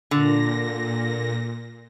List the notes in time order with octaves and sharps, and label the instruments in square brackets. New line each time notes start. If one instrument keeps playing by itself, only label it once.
[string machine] A#2 A#6 [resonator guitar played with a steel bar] D3